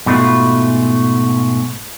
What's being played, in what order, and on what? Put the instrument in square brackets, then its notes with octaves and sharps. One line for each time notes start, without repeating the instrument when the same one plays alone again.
[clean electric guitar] G#2 B2 A3 D#4 F4 F#4